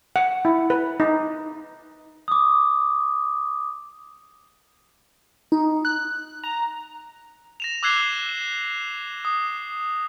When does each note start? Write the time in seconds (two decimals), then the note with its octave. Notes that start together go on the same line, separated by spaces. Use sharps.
0.16 F#5
0.45 E4
0.70 B4
1.00 D#4
2.28 D6 D#6
5.52 D#4
5.85 F#6
6.44 A#5
7.60 A#6 E7 F7
7.83 D6 E6 F#6 G#6 C7 G7
8.29 E7
9.25 D#6